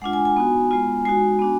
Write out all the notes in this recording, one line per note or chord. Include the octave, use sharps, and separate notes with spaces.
G#3 D4 F4 F#5
G#5
G#5
B3 D#4 F#4
G#3 B3 F4
G#3 D#4 F#4 G#5
B3 D4 F#4